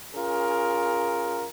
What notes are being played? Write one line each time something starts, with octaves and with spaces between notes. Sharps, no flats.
C#4 F4 G#4 A#4